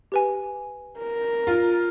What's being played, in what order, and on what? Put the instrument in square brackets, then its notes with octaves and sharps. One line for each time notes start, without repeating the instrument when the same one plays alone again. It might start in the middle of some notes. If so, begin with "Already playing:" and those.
[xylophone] G4 B4 G#5
[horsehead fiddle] A#4
[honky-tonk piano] F4